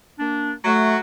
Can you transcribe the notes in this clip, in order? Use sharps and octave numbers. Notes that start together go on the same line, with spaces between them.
A#3 D4
F#3 A3 F#4